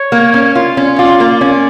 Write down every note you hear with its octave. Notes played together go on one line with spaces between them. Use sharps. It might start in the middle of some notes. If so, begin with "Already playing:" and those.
Already playing: C#5
A#3
C#4
F4
C#4
F4 D5
A#3
C#4